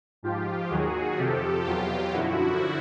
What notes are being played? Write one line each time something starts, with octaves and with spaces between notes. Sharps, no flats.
G#2 F3 F4 G4
D#2 D#3 F#3 F#4 G#4
F2 C3 F3 G4 A4
E2 B2 F#3 F4 G4
F#2 D3 F3 E4 F#4